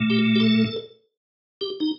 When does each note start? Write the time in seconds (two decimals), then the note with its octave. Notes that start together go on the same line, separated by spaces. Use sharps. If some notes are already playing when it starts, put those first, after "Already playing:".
Already playing: A#2 A3
0.10 G4
0.35 G4
0.40 A4
1.61 G4
1.80 D#4